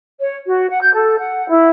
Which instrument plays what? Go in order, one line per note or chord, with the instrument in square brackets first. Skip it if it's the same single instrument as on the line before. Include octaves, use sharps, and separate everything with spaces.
[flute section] C#5
F#4
F#5
G6
A4
F#5
E4